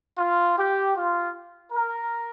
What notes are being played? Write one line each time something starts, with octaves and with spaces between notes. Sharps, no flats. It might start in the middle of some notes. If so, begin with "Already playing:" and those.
F4
G4
F4
A#4